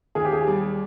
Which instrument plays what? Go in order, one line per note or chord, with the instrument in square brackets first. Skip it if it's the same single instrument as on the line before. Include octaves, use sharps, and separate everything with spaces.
[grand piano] D#2 [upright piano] G#4
[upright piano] G4
G#4
[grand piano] G3